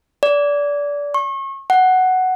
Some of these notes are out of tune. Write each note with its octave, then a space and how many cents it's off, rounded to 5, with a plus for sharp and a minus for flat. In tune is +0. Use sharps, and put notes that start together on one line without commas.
D5 -25
C#6 -35
F#5 +5